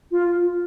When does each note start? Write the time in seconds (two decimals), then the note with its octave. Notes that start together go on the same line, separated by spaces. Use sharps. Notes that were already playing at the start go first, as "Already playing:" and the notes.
0.11 F4